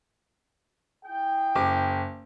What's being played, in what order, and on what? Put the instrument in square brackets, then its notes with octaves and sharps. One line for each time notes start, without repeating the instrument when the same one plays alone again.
[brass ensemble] E4 G#4 G5
[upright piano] F#1 D6